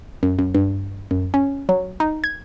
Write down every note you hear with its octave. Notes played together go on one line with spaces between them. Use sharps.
F#2
F#2
G2
F#2
C#4
F#3
D#4
G#6